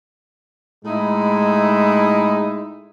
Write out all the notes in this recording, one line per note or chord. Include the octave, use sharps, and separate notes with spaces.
A2 G#3 D#4 E4